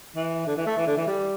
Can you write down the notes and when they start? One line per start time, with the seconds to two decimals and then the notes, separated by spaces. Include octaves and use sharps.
0.16 E3
0.46 D3
0.57 E3
0.66 A3
0.77 E3
0.87 D3
0.97 E3
1.07 G3